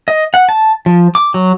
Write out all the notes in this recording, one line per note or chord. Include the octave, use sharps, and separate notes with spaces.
D#5
F#5
A5
F3
D6
F#3